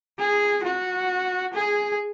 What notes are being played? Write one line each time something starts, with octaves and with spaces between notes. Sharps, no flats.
G#4
F#4
G#4